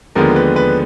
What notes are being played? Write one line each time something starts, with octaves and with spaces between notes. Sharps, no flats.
D#2 D3 F3 G#3 B3 A#4
B4
B4